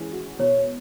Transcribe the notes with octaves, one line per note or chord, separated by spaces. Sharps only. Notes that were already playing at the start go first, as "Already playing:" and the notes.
Already playing: E3 G#3 C#4
F#4
B2 C#5